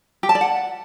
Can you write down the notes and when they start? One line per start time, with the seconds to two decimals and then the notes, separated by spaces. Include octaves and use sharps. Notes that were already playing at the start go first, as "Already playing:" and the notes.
0.23 G4
0.29 A5
0.35 D5
0.41 F#5